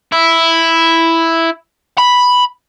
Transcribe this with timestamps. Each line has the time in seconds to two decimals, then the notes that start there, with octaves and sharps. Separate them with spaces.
0.12 E4
1.98 B5